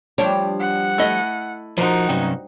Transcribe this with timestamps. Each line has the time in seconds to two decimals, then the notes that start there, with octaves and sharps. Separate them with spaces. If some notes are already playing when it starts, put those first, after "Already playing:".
0.18 F3 G3 D4 C#5
0.60 F#5
0.98 A3 E4 D#5
1.78 F3 D#4 F#4 A#4 C5
2.09 G2 C3 F#3 C#4